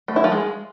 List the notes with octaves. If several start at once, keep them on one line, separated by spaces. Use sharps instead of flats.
A3
E4
F3
G#3